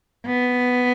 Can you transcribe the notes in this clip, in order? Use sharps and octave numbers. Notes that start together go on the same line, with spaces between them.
B3